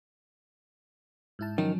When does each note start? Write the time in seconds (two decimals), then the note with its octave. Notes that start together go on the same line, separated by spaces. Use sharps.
1.39 G#2 E4 A5
1.58 D#3 F3 F#3 C#4